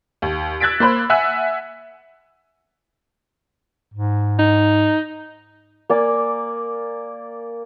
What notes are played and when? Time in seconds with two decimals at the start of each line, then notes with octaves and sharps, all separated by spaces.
0.22 D#2
0.60 E6 F#6 G#6 A6 B6 D7
0.80 A#3 C5 B5 F#6
1.10 E5 F#5 G#5 E6 F#6
3.94 G#2
4.39 D#4
5.89 A#3 D5 G#5